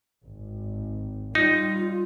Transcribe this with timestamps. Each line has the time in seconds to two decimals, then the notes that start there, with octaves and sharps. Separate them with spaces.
0.25 G#1
1.35 G3 D#4 F4